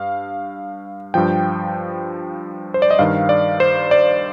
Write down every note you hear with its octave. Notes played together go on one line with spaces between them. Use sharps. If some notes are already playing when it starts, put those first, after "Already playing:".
Already playing: G2 F5
G2 F3 G5
C5
D5
D#5
G2 D#3 F5
D5
C5
D5